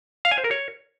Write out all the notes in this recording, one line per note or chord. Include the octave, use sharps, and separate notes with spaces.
F5
G#5
C5
A#4
C#5